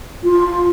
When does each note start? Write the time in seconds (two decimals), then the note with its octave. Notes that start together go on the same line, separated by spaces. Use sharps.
0.23 F4